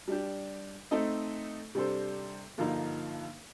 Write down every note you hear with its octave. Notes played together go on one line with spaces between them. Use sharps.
G3 D4 G4
A3 C4 D#4 A4 D#5
C3 G3 D4 A4 C5
G2 D3 F3 A#3 D#4